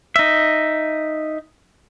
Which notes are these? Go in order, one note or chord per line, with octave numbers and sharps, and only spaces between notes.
D#4 E5